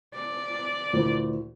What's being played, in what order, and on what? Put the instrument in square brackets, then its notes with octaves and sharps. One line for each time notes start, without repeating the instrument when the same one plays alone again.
[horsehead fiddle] D5
[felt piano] D2 A#2 E3